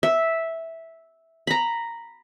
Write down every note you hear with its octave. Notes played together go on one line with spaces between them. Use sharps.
E5
A#5 B5